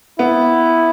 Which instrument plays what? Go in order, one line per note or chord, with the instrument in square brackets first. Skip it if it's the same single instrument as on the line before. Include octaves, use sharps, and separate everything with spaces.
[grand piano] B3 [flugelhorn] E4